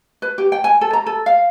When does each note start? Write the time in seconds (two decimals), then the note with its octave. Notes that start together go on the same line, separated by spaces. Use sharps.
0.22 B4
0.38 G4
0.52 G5
0.64 G#5
0.81 A4
0.93 A#5
1.06 A4
1.26 F5